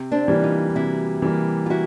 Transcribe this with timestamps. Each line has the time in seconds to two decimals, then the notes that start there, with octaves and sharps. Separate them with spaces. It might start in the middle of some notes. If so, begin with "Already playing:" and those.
Already playing: C3
0.12 C4 D4
0.28 E3 G3 A#3
0.43 D#4 F4
0.75 C3 E4 F#4
1.22 E3 G3 A#3
1.66 F4
1.70 E4 F#4